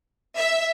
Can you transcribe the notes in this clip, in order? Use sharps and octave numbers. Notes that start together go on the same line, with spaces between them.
E5